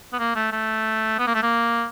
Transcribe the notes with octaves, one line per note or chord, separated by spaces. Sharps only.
B3
A#3
A3
A3
B3
A#3
A3
A#3